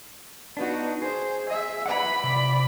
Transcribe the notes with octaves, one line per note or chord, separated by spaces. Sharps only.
B3 D4 D#4 F#4
G#4 C5
E5
B4 D5 E5 F#5 B5
C3